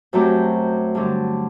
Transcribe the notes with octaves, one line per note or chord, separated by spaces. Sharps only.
F#2 F#3 A3 C4 G4
G2 D3 F#3